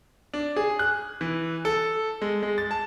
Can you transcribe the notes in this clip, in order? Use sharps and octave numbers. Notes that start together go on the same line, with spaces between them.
D4
G#4
F#6
E3
A4
G#3
G#3
A6
A5